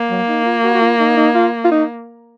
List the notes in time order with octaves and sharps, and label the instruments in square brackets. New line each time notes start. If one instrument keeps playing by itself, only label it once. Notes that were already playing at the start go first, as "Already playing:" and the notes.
Already playing: [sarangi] A#3
[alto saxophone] F#3
D#4
F4
F#4
F#4
F4
D#4
D#4
F4
F4
D#4